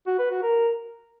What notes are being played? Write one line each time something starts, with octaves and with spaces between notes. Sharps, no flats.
F#4
B4
F#4
A#4